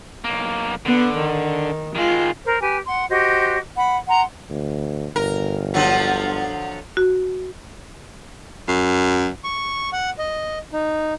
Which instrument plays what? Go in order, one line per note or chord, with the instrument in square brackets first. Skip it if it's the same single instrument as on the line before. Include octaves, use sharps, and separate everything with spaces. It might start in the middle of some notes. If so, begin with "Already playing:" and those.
[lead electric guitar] B1 A#3
[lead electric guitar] D3 [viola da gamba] B3
[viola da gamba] D#3
[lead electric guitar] D#3 G#3 [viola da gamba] F4
[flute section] A#4 C5
G4 B4 G#5
F#5 C6
F#4 G4 C5 D#5
F#5 B5
F#5 A#5 C6
[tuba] D2
[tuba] G1 [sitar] A#4
[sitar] D3 F3 F#3
[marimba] F#4
[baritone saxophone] F#2
[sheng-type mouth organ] C#6
F#5
D#5
D#4